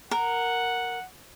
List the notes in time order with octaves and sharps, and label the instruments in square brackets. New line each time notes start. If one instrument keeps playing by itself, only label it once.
[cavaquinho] A#4 [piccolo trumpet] F#5